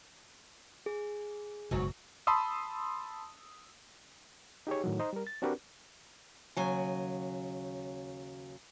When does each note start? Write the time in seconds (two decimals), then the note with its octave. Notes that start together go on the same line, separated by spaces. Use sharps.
0.86 G#4
1.71 F#1 G#2 B2 F#3
2.27 A5 B5 C6 D#6 E6
4.67 D#4 G4 G#4 C#5
4.84 A2 D#3 F#3
4.99 D#4 C5 D#5 A#5
5.13 G3 A#4
5.27 A6
5.42 C4 D4 F#4 G4 A#4 B4
6.57 D#2 C#3 F#3 G#5